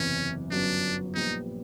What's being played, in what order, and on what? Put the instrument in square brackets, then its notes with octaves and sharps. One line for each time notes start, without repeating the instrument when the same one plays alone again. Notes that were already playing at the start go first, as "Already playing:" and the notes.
Already playing: [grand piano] F#1 E2 C3 E3 [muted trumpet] C#4
[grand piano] G1 F#2 C#3 F#3 B3 [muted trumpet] D4
[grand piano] A#1 A#2 G3 B3 [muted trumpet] D#4